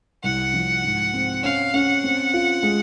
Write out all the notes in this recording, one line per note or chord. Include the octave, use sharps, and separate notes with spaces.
C2 F#5
F3
G#2
C4
C#4 F5
C#4 F#5
C4
F4
G#3